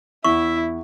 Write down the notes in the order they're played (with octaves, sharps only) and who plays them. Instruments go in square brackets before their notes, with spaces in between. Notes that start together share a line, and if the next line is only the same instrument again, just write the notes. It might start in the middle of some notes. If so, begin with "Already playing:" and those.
[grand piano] E2 [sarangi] E4 [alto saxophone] E5 [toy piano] C#6